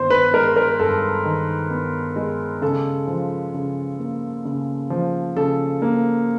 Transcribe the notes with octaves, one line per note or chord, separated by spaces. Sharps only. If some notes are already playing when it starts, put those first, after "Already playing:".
Already playing: G2 D#3 B3 C5
B4
G#3 A#4
A#4
G2 A4
D#3
B3
G#3
C#3 A4
F3
C#3
A#3
C#3
F3
C#3 A4
A#3